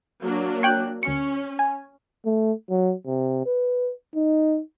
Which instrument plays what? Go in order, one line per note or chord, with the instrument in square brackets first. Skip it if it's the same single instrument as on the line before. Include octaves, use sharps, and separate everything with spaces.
[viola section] F#3 A#3 D4
[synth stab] C#5 G5 F#6
[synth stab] D2 C#7 [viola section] C#4
[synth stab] G#5
[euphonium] A3
F#3
C3
B4
D#4